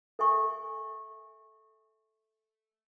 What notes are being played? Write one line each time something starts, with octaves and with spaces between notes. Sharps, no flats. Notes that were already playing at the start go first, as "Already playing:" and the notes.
A4 E5 G#5 C#6